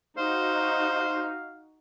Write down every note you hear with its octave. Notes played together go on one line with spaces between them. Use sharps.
D#4 F#4 C5 F5